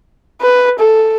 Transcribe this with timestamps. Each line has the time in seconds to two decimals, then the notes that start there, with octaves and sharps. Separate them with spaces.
0.41 B4
0.79 A4